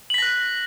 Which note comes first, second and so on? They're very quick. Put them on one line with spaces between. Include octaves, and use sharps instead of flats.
F#7 B6 A#6 F#6